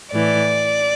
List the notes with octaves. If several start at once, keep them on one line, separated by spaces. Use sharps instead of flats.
A2 E3 D5